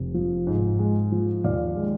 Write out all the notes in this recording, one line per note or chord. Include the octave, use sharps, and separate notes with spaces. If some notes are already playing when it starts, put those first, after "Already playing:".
Already playing: F1
F3
G#2
G#3
F3
D#2 D5 F5
G#3